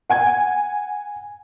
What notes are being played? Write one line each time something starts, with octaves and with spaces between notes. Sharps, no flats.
F#5 G#5 G#6